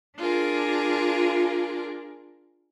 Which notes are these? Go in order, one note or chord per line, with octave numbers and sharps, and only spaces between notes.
D4 F4 G#4 A#4